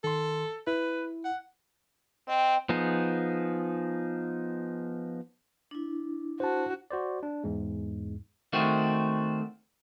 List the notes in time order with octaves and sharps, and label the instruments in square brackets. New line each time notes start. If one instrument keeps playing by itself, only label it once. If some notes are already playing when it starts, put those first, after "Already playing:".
[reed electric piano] D#3 C6 [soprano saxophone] A4
[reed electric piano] E4 [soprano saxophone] B4
[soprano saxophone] F#5
[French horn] C4 [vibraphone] D#5 G5
[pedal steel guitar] F3 B3 D#4 G#4
[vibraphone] D4 E4
[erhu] F#4 [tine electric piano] C5 A5
[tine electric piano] F#4 C5 D5
D4
E2 G#2 G#3
[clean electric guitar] D#3 A3 C4 F#4